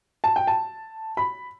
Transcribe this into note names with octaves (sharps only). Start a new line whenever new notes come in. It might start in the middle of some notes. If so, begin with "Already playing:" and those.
A5
G5
A5
B5